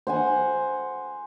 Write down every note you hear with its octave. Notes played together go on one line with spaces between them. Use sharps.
C5 F#5 G#5